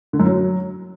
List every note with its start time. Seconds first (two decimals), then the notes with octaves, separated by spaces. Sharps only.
0.13 D3
0.20 F#2
0.26 F#3